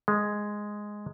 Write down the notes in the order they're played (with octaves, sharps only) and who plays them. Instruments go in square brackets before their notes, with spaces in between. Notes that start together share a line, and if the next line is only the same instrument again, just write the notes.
[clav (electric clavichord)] G#3